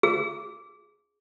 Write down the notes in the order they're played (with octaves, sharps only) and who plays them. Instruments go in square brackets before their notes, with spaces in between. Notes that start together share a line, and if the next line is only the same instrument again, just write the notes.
[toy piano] G#4